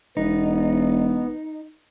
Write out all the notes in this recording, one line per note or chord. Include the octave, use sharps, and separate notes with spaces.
E1 B3 D#4